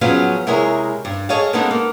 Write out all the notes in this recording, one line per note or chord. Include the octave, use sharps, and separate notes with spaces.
F3 F#3 B3 C#4 G#4 F5
C3 G#3 E4 G#4 A#4 C#5
G2
G#4 A4 C#5 D#5 F5
G#3 A#3 B3 C#4 D#4 A4
A#3